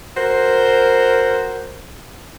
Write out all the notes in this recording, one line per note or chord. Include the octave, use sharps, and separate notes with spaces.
F#4 A#4 C5